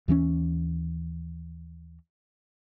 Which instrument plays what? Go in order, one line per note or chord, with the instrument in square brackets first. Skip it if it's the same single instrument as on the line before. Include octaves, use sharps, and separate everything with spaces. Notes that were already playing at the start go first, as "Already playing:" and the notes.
[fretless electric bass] D#2 E3 A#3 C#4